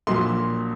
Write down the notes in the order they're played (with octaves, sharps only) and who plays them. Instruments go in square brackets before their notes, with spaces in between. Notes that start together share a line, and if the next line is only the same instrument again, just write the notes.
[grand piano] A#1 A#2 F#3 C6